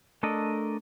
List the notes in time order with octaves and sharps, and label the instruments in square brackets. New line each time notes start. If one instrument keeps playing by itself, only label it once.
[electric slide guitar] A3 D4 A4 A#4 D#5